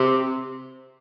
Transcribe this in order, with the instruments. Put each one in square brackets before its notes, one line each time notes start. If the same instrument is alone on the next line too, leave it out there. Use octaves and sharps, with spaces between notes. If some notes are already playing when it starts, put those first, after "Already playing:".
Already playing: [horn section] C3